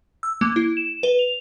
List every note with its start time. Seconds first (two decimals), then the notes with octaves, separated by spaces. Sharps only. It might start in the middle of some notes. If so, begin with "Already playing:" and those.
0.23 E6
0.41 A#3
0.56 E4
0.77 E7
1.03 B4
1.19 F7